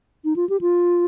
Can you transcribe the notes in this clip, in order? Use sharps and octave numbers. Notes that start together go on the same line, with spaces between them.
D#4
F4
G4
F4